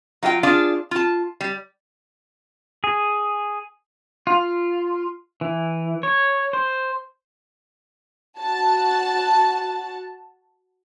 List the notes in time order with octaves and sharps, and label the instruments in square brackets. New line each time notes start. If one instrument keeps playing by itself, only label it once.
[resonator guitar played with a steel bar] F#3 F4 D#5 G5
D4 F4 G#4 F5
F4 A5
G3
[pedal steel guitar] G#4
F4
E3
C#5
C5
[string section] F#4 A5